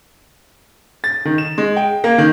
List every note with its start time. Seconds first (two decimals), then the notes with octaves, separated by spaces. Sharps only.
1.04 A6
1.25 D#3
1.38 E7
1.58 G#3
1.77 G5
2.04 A#3
2.18 D#3